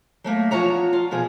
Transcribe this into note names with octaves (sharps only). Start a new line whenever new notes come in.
F#3 A3 A#3
E2 G#2 F3 F#4 C#5 A#5
F4
B2 F3 G#4